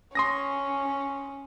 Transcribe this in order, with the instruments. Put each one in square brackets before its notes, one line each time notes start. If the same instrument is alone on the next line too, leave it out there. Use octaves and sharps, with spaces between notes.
[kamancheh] C#4 [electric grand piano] C6 D#6 A#6